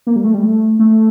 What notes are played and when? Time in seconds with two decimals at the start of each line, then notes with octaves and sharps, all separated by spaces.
0.07 A#3
0.16 G3
0.24 A3
0.34 G3
0.43 A3
0.79 A3